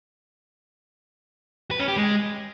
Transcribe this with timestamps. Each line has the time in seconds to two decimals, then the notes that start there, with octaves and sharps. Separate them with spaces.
1.71 B4
1.80 C#4
1.88 G4
1.97 G#3